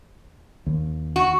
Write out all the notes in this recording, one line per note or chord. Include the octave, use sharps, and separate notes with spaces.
D#2
F#4